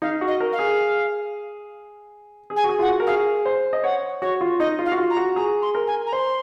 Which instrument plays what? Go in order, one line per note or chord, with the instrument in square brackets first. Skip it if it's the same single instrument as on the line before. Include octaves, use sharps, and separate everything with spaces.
[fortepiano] D#4 [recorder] F5
[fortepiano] F#4
[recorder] D#5
[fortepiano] A#4
[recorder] F5
[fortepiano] G#4
G#4
[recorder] G#5
[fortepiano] F#4
G#4
[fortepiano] F4 [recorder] F#5
[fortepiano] F#4
A#4
[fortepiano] G#4 [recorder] F5
[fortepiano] C5
D#5
[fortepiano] C#5 [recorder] F#5
[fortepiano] F#4 [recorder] C#5
[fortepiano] F4
[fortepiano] D#4 [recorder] D#5
[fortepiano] F4
[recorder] F5
[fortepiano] F#4
F4
[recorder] A#5
[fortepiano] F#4
[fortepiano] G#4 [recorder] A#5
[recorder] C6
[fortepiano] A#4
[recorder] G#5
A#5
[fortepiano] C5 [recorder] C6